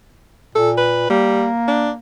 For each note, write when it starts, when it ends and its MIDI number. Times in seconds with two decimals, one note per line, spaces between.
0.55 1.08 46
0.55 0.70 69
0.77 1.06 71
1.10 1.48 55
1.10 1.99 58
1.68 1.90 62